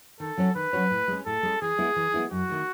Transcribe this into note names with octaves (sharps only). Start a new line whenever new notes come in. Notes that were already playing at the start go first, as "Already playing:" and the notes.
D#3 A4
F#3 C#4 F#4 C#5
D#3 B4
F#3 C#4 F#4 C#5
A2
G#3 C#4
A2 A4
G#3 C#4
E3 G#4
G#3 B3 E4
E3
G#3 B3 E4
F#2 F#4
D#3 A3